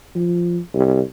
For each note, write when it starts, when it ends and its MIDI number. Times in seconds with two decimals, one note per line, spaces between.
0.15 0.59 53
0.74 1.00 36